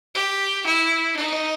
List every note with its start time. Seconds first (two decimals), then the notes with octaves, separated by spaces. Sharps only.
0.15 G4
0.66 E4
1.16 D#4